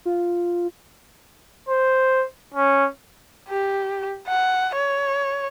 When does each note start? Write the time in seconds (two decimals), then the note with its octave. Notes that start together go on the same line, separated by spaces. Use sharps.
0.05 F4
1.69 C5
2.54 C#4
3.49 G4
4.27 F#5
4.75 C#5